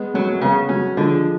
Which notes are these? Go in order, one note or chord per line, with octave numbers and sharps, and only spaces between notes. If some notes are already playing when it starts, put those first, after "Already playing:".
Already playing: G#3 B3
F#3 A3 C#4
A3
C#3 G#3 B3
F#3 A3 C#4
D3 F3 G#3